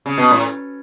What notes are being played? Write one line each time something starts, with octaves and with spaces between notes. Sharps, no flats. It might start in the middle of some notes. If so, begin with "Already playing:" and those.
C#3
B2
A2